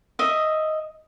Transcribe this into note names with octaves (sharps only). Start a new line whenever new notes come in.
D#5 E5